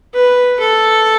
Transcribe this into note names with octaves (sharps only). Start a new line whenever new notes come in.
B4
A4